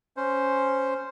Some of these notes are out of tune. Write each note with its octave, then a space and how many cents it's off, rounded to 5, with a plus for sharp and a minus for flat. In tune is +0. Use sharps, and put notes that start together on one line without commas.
C#4 +0 C5 +0